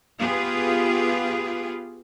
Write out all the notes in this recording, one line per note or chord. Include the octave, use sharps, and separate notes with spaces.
B3 F4 G4 G#4 B4